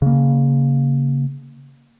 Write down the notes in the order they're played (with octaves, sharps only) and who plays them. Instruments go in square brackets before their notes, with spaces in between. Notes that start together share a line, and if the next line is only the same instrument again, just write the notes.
[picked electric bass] C#3 A#3